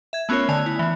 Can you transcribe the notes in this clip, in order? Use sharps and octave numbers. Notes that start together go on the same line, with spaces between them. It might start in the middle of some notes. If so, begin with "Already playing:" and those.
E5 G#6
A3 B3 C#4 F4 A#4 C#5
D3 G#5 F7
E4
E3 B3